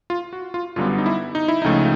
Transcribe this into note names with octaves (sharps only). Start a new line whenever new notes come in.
F4
F#4
F4
G1 F#2 D3 G3 B3 F4
D#4
E4
D#4
E4
C#2 C#3 F3 A3 D#4